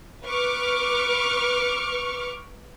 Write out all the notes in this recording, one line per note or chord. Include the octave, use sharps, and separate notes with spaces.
B4 C#6 D6 F6